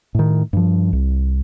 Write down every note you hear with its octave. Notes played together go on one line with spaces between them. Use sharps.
A2 D#3
G2 F3
C2